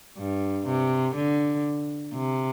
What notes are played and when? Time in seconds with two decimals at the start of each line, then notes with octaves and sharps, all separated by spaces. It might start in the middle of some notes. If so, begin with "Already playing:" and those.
0.18 G2
0.67 C3
1.15 D3
2.14 C3